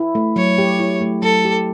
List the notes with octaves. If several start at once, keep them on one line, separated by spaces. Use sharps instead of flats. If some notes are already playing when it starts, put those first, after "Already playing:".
Already playing: E4
A3
F#3 C#5
G4
E4
A3
F#3 A4
G4